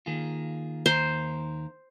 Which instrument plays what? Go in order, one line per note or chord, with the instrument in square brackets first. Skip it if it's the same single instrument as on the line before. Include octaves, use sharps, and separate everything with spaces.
[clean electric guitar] D#3 A#3 F4 G#4
[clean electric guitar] D#2 D#3 A#3 D#4 A#4 [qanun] C5